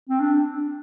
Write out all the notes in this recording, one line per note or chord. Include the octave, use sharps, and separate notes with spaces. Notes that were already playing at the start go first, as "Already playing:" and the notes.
C4
D4